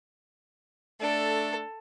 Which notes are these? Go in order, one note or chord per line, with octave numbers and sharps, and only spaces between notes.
A3 D4 A4